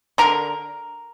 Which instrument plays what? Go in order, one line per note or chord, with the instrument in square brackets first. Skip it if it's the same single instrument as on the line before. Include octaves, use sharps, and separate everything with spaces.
[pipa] D3 A#4